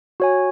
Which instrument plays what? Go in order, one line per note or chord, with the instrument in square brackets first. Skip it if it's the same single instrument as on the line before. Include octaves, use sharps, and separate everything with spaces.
[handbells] F#4 C#5 G#5